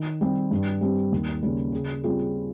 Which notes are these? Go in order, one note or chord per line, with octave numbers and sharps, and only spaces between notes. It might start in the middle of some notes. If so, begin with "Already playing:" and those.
Already playing: D#3
G3 C4 G4
G2
G3 C4 G4
D#2
C#3 G3 A#3 C#4
C#3
G3 C4 F4 G#4